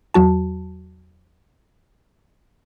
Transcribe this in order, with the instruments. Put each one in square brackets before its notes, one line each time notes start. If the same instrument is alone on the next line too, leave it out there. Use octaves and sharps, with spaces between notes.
[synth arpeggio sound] E2 F#3 F#4 A5